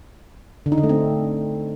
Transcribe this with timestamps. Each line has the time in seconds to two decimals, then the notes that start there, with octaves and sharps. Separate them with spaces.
0.66 D3
0.72 D#4
0.78 D3
0.83 A3
0.89 C4